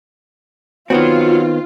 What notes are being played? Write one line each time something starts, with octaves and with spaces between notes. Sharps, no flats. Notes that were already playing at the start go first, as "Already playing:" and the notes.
D#3 B3 C4 F4 F#4 C#5